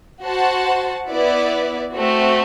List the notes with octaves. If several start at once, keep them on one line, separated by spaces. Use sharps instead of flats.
F#4 C5 F#5 A5
B3 E4 B4 D5
A3 C4 F#4